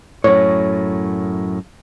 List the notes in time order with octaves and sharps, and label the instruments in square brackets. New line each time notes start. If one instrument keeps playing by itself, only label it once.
[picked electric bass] F#2 A2 [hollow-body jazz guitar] C#5